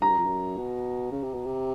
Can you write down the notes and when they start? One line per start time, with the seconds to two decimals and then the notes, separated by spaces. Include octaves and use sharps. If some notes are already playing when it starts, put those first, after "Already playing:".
0.01 G2 A#5
0.09 F#2
0.18 F2
0.26 F#2
0.57 B2
1.11 C#3
1.23 C3
1.33 B2
1.46 C3